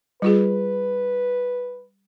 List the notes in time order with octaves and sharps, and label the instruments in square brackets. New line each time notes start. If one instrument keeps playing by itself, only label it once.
[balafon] G3 F4 G#4 [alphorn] B4